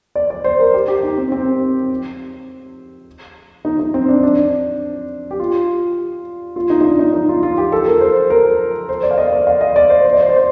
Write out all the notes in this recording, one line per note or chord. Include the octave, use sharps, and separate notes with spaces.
D5
D5
C5
A#4
G4
G4
D#4
C4
C4
D#4
D#4
C4
D4
D4
G4
F4
F4
D#4
D#4
D4
D#4
D#4
F4
F4
G4
A4
A#4
C5
A#4
C5
D5
F5
D#5
D5
F5
D#5
D5
C5
C5
D5
C5
D5
C5